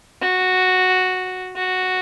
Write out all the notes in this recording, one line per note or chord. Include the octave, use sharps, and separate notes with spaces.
F#4
F#4